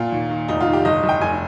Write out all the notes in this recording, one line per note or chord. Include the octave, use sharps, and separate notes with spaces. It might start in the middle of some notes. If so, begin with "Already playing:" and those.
Already playing: A#2 F4
D#2
D#3
F1 D#4
F4
D#3
G4
G1 D#5
G1
G5
F1 G#5